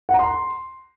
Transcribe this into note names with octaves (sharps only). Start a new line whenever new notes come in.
F#5
A#5
C6